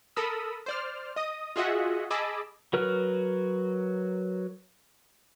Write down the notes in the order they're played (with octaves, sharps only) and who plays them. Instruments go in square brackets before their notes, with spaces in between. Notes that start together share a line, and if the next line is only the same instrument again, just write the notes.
[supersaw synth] A4 A#4 B5 D#6 E6
C5 D5 F6
D#5 D#6
F4 F#4 G#4 D#5 E5 F#5
G#4 D#5 A5 B5 D6 E6
[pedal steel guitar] F#3 F#4 A#4 B4 F6